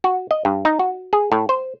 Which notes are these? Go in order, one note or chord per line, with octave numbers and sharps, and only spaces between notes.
F#4
D#5
G2
D#4
F#4
G#4
A2
C5